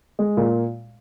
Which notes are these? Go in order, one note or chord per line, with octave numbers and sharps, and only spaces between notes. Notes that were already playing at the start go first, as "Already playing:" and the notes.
G#3
A#2